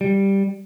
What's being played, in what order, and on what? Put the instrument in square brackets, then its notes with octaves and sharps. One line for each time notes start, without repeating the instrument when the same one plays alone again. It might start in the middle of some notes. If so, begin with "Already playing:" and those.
[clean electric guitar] G3